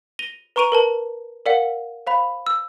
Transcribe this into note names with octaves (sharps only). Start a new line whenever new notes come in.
A#6 D#7 F7 G7
B4 A#5 C#6 D7 D#7 F7
A#4 B4 A5
A#4 D5 F5 F#5
C5 F5 B5
E6